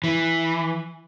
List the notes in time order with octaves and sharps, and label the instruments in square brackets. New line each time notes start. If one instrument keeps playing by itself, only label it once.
[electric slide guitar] E3